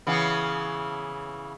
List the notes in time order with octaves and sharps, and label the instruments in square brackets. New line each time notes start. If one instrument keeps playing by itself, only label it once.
[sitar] C#3 E3 B3